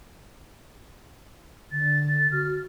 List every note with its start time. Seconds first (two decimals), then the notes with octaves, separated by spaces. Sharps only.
1.72 D3 A6
2.32 F#4 F6